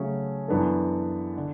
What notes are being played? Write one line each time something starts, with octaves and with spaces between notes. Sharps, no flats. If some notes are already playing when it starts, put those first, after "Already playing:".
Already playing: C#3 F#3 A3 C#4 G#4
F#2 E3 B3 D4 A4
D3